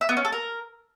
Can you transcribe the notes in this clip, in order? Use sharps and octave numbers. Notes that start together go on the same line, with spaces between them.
E5
B3
C#4
A4
A#4